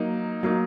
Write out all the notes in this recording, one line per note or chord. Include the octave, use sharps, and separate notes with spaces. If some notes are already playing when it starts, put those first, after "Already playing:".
Already playing: F#3 A#3 D#4
F#3 A#3 D#4